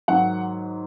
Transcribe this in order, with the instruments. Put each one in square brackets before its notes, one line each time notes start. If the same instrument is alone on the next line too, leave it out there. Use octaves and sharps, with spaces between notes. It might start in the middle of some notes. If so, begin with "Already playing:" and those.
[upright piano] G#2 D#3 F#3 F#5